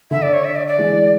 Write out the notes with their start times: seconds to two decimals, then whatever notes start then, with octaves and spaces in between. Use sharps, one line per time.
0.11 D3 E5
0.22 D5
0.33 C#5
0.44 E5
0.56 D5
0.67 D5
0.78 E3 G#3